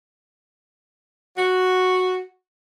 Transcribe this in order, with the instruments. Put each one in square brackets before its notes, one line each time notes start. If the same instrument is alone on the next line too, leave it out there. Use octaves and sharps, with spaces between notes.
[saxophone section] F#4